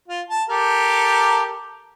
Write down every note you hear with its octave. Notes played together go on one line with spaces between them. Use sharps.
F4
A5
G4 A4 A#4